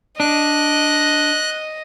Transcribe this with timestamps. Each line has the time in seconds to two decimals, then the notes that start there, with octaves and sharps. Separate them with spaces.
0.20 D4 D#5 F#6